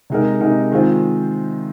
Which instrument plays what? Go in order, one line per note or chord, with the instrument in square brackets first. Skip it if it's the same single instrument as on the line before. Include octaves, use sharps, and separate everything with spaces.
[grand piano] C3 G#3 D#4 A#4
C3 G#3 D#4 A#4
D#3 G#3 C4 F4 C5